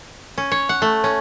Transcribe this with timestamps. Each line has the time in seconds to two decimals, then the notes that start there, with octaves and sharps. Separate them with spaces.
0.38 C#4
0.52 C#5
0.69 F#5
0.82 A3
1.04 C#4